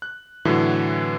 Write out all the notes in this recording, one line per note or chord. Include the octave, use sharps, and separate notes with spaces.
F#6
A2 D3 E3 F#3